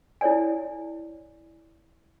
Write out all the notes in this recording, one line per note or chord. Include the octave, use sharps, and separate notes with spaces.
E4 A4 C#5 D5 G#5